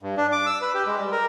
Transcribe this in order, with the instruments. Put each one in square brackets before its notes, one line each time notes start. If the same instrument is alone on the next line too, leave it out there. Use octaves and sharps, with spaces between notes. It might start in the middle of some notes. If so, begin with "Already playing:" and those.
[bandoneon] G2
D4
D6
E6
B4
G4
G#3
G3
A#4